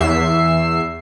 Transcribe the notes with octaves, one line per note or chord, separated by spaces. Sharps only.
E2 E5 C7